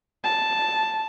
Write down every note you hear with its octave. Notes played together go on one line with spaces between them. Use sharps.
A5